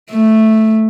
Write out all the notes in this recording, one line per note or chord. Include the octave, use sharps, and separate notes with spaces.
A3